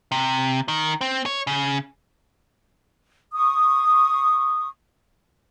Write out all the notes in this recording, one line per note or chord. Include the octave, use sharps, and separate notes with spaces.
C3
D#3
C4
C#5
C#3
C#6 D#6